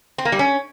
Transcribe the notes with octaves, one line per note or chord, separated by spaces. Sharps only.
C4
A#3
G3
C#4